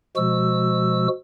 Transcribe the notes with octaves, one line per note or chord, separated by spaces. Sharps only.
B2 F3 G#3 F#4 E6